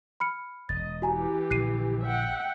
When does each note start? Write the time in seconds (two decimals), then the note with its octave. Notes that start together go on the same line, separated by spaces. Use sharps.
0.20 B5 F6 C#7
0.69 E1 D#5 A6
1.02 E3 F#4 G4 G#5 A#5
1.50 A#1 A#2 D3 F#6 C7 D#7
2.04 E5 F#5 G5